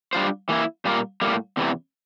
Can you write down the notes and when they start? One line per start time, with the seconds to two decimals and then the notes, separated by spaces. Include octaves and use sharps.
0.13 G3 D4 F4 C5
0.49 E3 A#3 E4
0.85 A#2 G3 A#3 F4 A#4
1.21 A2 G3 A#3
1.57 E2 C3 E3